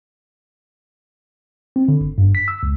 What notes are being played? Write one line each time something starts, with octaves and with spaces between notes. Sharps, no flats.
C4
D3
G1
G2
B6
E6
C#2